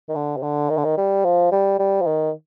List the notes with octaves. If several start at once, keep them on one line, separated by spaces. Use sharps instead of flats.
D#3
D3
C3
D3
D#3
D3
D#3
G3
F3
G3
G3
F3
D#3